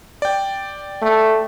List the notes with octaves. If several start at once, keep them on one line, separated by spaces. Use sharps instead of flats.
D5 G5
A3